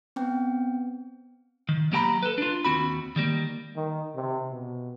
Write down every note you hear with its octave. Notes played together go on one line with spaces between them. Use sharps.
B3 C4 G5
D#3
F#3 A#3 G4 G5 A#5 B5
A4 B4
D4 F4
D#2 C4 F#4 B5
D#3 G3 A#3
D#3
C3
B2